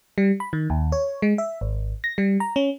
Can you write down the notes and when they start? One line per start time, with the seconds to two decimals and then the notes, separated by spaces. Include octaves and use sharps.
0.18 G3
0.40 B5
0.53 D#3
0.70 D#2
0.92 C#5
1.22 G#3
1.38 E5
1.61 G#1
2.04 A#6
2.18 G3
2.40 A#5
2.56 C#4